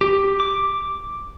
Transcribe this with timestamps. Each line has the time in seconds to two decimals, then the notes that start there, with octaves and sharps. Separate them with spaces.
0.01 G4
0.40 D6